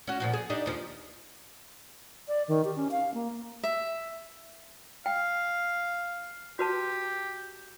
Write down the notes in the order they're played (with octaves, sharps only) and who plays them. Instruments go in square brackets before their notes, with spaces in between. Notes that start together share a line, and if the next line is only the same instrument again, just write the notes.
[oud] C#4 F#4
A#2 F3 F#4
G#4
D4 D#4 G4
D#2 F3
[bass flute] D5
D#3
G4
C#4
F5
A#3
[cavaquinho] E5
[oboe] F5 [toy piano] G5
[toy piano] F#4 B4 A5 [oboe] G4